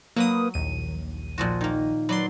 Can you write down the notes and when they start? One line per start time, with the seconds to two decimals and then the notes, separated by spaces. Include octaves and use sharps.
0.16 F#3 A#3 B4 D#6
0.54 A#1 D#2 D#7
1.38 A#2 F3 F#4
1.61 D#3 A#3
2.09 F#3 B4 D5 C6